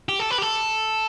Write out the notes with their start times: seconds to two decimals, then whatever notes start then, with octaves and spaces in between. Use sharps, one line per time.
0.09 G4
0.19 A4
0.31 B4
0.38 G4
0.42 A4